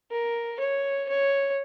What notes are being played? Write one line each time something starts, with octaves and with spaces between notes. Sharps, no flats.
A#4
C#5
C#5